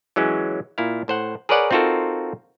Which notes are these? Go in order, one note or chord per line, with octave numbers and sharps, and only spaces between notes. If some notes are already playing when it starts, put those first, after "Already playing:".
E3 F#3 G#3 C#4
A#2 E4 F5
A2 C5 F#5
G#4 A#4 B4 C#5 D5 F#5
C4 D#4 F4 F#4 A4 A#4